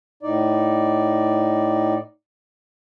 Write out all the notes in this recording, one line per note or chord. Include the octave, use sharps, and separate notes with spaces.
A2 D#4 D5